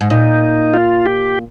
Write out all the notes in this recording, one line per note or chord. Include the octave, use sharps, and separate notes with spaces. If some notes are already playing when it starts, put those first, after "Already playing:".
G#2
A#2 D#4
F4
G4